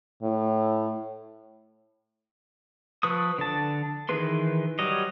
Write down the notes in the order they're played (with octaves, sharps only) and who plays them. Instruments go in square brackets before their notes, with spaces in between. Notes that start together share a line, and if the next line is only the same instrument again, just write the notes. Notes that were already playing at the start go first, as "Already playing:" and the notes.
[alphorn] A2
[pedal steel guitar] F3 B4 C#6 D#6
D3 A5
D#3 E3 G#4 B4 C6
F#3 G3 C#5 D#5